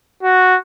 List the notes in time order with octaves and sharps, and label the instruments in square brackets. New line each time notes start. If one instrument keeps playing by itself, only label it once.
[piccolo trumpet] F#4